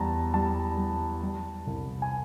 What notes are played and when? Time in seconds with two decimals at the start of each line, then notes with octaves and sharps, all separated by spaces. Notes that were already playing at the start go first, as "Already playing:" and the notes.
Already playing: E2 G3 A5 A#5
0.34 G3 A5
0.77 G3
1.23 G3
1.67 C2
2.02 G#5